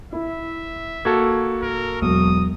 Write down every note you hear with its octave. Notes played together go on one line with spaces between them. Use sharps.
E4 E5
A#3 F#4 A4 G#6
G#2 A#4
E1 B2 F#3 D#6